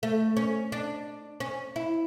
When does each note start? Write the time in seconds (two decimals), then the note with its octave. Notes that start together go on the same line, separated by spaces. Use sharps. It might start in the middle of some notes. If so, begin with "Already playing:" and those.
0.03 A3
0.37 C#4
0.72 D4
1.40 C#4
1.76 E4